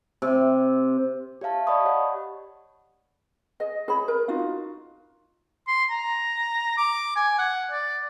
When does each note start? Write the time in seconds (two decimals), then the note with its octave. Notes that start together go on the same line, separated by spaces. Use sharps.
0.22 C3
1.41 G4 C#5 E5 F5 A5
1.67 D5 D#5 A5 B5 C#6 D#6
1.85 G4 C#5 F#5
3.60 G#4 D#5
3.88 G#4 C#5 B5
4.08 A#4
4.28 D#4 F4 F#4 F5
5.68 C6
5.90 A#5
6.77 D6
7.16 G#5
7.38 F#5
7.71 D5